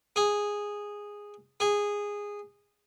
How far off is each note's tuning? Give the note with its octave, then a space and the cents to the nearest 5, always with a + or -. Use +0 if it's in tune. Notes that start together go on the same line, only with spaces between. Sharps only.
G#4 -10
G#4 -15